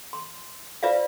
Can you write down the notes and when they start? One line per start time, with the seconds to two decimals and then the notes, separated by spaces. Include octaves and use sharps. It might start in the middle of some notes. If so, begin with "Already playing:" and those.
0.13 C6
0.83 F4 B4 C5 D5 E5 F5